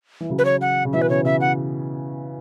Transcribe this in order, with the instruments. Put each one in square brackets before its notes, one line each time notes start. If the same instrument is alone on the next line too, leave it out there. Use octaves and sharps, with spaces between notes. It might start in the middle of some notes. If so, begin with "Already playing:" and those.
[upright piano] E3
C#3 F#3
[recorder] B4
C#5
F#5
[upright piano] C#3
[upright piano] B2 E3 [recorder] E5
[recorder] B4
[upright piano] C#3 [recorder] C#5
[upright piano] C#3 [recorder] E5
[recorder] F#5